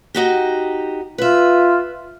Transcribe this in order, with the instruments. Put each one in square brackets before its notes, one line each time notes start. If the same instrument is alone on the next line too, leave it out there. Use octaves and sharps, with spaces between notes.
[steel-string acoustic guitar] D#4 F#4 G4
[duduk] F4 [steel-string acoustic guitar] B4 E5